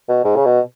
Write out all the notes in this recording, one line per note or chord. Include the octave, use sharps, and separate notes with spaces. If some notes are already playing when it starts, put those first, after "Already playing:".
B2
G#2
C#3
B2